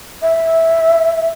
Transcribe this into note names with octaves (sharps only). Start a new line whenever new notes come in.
E5